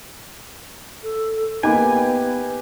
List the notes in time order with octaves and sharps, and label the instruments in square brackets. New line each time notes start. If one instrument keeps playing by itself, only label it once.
[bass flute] A4
[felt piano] A#3 D#4 [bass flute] B3 [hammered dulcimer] G4 B4 [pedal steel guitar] G#5